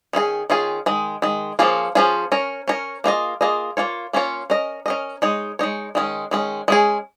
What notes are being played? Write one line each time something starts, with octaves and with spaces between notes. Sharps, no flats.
D#3 C#4 F4 G#4
D#3 C#4 F4 G#4
D#3 G#3
D#3 G#3
F3 A#3 C#4 F4 G#4
F3 A#3 C#4 F4 G#4
C#4 A#4 C#5
C#4 A#4 C#5
A#3 F4 G#4 D#5
A#3 F4 G#4 D#5
A#3 C#4 F4 C#5
A#3 C#4 F4 C#5
C#4 A#4 D#5
C#4 A#4 D#5
G#3 D#4 C#5
G#3 D#4 C#5
D#3 G#3 C#4
D#3 G#3 C#4
G#3 C#4 G#4